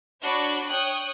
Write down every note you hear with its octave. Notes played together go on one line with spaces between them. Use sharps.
D4 F#4 C#5 B5 F#6
C#5 G5 D#6 F#6